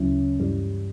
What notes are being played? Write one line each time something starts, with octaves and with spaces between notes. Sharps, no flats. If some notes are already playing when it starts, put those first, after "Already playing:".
Already playing: D2 C#3 F#3 C#4 E4
G2 E3 G3